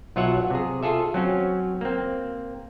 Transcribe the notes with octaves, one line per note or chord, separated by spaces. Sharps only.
B1 F#3 F4 C#5 E5 F#5
C3 G#4
F4 G#4 A4 E5
F#3 C4 C#4
A#3 C4